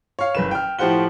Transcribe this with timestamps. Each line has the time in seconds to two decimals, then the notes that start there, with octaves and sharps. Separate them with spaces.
0.19 C#5 F5
0.35 F#1 B4 E7
0.51 G5 F6
0.79 A2 F3 G4 C5 F#5 G7